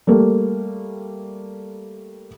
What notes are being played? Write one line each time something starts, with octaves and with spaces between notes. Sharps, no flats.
G3 A3 A#3